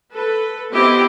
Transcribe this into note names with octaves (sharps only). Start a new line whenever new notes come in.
A4 B4
B3 C4 E4 G4 D#5